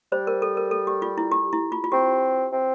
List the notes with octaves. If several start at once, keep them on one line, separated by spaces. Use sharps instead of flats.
G3 C5
A#4
A4
A#4
A4
G4
F4
E4
G4
E4
F4
F4
C4 G4
C4